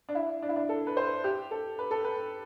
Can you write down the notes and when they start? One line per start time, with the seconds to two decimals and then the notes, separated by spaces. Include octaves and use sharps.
0.09 D4
0.15 E4
0.42 D4
0.49 E4
0.56 D4
0.69 A4
0.87 B4
0.97 C5
1.24 G4
1.51 A4
1.79 B4
1.91 A4
2.04 B4